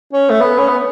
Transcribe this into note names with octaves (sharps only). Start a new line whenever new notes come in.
C#4
A3
B3
C#4
B3